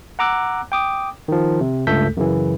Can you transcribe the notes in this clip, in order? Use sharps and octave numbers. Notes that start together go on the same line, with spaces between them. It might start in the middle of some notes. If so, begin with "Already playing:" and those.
F#5 A#5 D6 E6 F#6
G5 D6 D#6
D#3 F3
C3
C#2 G2 A3 A4 G6 B6
F#2 C#3 E3